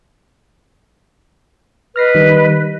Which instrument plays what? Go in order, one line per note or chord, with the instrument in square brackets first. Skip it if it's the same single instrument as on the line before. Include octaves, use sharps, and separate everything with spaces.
[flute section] B4 D#5 [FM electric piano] F6 A#6 C7
[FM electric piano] D#3 G3